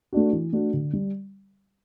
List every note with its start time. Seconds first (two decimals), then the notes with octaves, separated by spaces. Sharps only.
0.13 A3 D4 F#4
0.33 E3
0.53 A3 D4 F#4
0.73 D3
0.93 G3